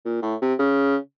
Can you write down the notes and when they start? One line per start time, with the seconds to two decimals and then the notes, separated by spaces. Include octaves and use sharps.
0.05 A#2
0.22 A2
0.42 C3
0.59 C#3